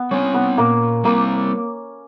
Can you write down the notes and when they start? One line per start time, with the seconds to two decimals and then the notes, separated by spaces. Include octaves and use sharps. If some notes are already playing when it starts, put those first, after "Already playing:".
Already playing: B3
0.11 G3 C4 C#4
0.34 B3
0.58 A#2 A#3
1.04 G3 A#3 C4